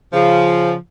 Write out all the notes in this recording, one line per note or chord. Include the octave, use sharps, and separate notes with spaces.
C#3 F3